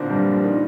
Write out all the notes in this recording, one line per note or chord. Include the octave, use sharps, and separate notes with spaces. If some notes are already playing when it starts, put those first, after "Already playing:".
Already playing: A#2 D3 A#3 C4 D4
G2 G3
F3
D#3